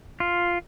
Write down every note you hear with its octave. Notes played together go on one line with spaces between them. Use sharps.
F4